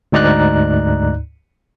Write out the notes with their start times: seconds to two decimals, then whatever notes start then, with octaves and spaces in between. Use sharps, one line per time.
0.12 D2 G#2 D#4 D5 A#5 F#6